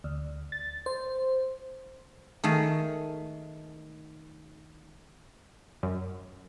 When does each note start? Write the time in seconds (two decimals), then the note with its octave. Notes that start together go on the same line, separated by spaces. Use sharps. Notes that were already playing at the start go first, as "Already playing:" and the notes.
0.04 D2
0.52 A6
0.86 C5
2.44 D#3 A3 G#4
5.83 F#2